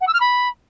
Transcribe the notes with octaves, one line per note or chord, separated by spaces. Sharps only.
F#5
E6
F6
B5